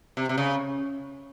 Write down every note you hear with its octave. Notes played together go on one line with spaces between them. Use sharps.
C3
C3
C#3